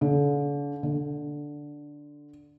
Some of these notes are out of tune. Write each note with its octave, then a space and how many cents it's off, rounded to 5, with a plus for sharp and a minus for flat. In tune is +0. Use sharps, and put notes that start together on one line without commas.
D3 -40
D3 +0